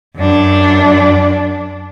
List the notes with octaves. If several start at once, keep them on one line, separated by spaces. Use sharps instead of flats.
F#2 D4